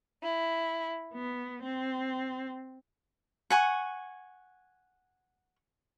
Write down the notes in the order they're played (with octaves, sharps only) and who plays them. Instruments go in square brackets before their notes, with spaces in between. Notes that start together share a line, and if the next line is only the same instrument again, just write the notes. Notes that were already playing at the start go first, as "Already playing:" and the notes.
[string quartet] E4
B3
C4
[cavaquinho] F#5 G#5 C#6